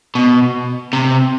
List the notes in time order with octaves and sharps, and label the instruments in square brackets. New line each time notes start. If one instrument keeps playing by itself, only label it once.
[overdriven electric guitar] B2
C3